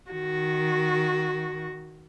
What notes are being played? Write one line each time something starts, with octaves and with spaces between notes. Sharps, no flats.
D#3 F#4